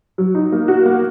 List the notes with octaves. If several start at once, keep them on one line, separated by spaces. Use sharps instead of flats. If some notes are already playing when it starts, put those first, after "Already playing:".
F#3
D#4
A#3
F#4
A#3